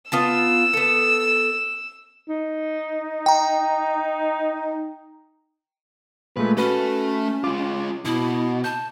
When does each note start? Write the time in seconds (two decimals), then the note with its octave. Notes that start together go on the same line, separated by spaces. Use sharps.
0.12 B3 F4 A5 E6
0.73 B3 A4
2.29 D#4
3.26 G5 A#5
6.37 A#2 G#3 A3 B4
6.58 A3 C#4 F#4 A4 B4 B5
7.44 G#3 F4 D6
8.05 B2 E4
8.64 A5 G6